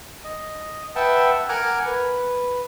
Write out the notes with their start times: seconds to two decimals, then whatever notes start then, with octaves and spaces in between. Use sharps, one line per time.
0.24 D#5
0.96 B4 E5 F#5 G5 A5
1.49 A#4 F#5 G#5 D6 F6
1.85 B4